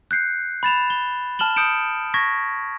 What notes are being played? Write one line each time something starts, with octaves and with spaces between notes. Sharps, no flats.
F#6 G6 C7 C#7
B5 A6 E7 F7
G7
A5 F6 E7 F#7 G7
D#6 G6 C#7 D7 E7
C#6 G#6 A#6 B6